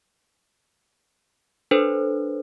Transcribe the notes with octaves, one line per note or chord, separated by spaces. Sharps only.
D4 A4 B4 C5